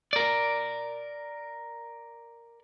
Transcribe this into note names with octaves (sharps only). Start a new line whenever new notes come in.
A#4 D5